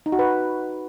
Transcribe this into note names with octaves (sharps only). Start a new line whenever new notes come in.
D#4
F#4
B4